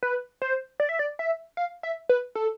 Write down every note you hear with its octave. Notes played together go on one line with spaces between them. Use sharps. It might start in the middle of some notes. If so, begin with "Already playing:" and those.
B4
C5
D5
E5
D5
E5
F5
E5
B4
A4